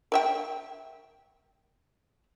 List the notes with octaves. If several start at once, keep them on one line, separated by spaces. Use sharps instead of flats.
A#4 E5 G5